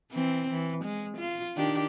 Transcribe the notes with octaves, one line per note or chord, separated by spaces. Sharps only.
E3 C4
E3
G#3
F4
D#3 D4 G4